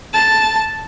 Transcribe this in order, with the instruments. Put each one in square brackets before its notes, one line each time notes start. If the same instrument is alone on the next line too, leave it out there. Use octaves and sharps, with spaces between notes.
[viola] A5